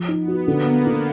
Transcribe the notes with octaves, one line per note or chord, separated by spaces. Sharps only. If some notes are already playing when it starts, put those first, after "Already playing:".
Already playing: F3
D#4
B3
F#4
D3 A#3
B3
A#3
D3